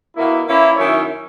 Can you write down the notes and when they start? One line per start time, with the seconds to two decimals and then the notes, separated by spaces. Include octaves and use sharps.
0.15 B2 A#3 E4
0.46 E3 A#3 C#4 E4
0.77 F#2 D#3 F#3 C#4 E4 C#5 E5